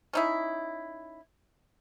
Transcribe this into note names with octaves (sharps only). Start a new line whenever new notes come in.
C#4 D#4 E4